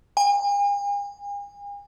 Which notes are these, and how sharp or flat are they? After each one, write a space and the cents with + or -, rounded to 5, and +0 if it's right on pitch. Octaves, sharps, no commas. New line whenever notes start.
G#5 -45